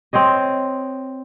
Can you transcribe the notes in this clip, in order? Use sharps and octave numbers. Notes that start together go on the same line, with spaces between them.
C4 C5 C#5 D#5